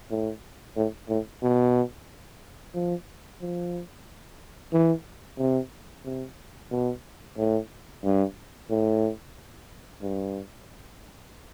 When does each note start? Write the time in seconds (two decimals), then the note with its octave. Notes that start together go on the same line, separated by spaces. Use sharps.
0.10 A2
0.76 A2
1.09 A2
1.42 B2
2.75 F3
3.41 F3
4.73 E3
5.39 C3
6.05 C3
6.71 B2
7.38 A2
8.04 G2
8.70 A2
10.02 G2